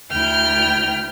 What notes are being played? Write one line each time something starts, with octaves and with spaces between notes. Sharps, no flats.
D2 E4 G5 F6 G6